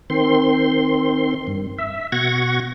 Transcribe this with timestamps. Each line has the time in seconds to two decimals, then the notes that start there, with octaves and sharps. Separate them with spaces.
0.10 D#3 C4 C6
1.47 G2
1.79 E5
2.12 B2 F#5 C#6 G#6 A#6